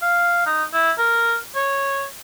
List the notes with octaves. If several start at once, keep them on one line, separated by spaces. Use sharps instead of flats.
F5
D#4
E4
A#4
C#5